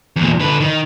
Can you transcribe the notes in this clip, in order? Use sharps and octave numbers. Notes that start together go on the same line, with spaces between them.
E2 A#2
D3 B4
D#3